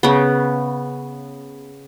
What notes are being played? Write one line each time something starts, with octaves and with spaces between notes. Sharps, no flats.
C#3 B3